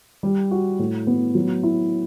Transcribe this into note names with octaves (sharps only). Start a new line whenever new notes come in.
G3
F#4
A2
B3
F#3
E4